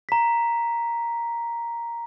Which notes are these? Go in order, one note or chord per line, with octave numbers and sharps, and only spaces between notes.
A#5 B6